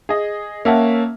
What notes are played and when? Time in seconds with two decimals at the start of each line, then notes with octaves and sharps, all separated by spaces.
0.09 G#4 D#5
0.65 A#3 C#4 E5 F#5 A5